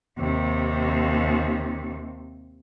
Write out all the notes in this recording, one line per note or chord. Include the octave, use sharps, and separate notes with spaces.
D#2 C3